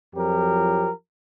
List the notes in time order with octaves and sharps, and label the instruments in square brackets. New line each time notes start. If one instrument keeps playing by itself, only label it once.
[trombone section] F2 F3 F#3 G4 A#4